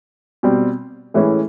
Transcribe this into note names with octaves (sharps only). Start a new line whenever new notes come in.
B2 G3 C4
A2 E3 G#3 C#4 E4